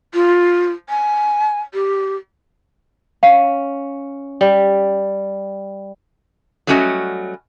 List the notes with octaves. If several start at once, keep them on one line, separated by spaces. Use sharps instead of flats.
F4
G#5
G4
C#4 F5
G3
F#3 G3 A3 C#4 F#4 D#5